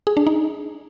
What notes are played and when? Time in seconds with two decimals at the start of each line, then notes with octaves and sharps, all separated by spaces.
0.07 G#4
0.17 D4
0.27 D#4